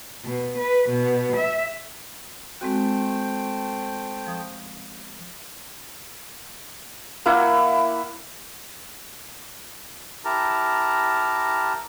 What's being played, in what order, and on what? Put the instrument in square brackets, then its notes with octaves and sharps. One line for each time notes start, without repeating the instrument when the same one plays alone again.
[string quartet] B2
B4
B2
E5
[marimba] G#3 C4 F#4 [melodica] A3 C5 G5
[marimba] F3 D#6
[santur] A#3 E4 F#5
[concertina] E4 G4 A#4 A5 A#5